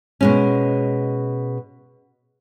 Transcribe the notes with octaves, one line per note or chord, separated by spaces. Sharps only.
B2 G#3 C#4